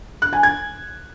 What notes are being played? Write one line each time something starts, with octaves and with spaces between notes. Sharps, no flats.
F#6
G#5
G#6